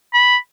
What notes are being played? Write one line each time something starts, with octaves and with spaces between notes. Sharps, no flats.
B5